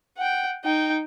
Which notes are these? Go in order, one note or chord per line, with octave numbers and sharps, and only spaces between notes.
F#5 G5
D#4 G5